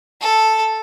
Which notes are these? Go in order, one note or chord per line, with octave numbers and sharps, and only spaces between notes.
A4